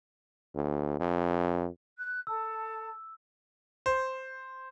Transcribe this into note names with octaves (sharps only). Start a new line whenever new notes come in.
D2
F2
F#6
A4 E6
C5